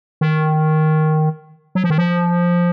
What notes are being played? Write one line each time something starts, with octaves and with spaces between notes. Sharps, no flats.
D#3
F#3
F3
D#3
F3